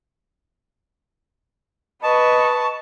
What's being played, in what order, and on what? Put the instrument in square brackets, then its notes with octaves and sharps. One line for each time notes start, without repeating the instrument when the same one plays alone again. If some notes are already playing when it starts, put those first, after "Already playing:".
[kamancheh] B4 C#6 [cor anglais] D#5 [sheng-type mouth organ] A5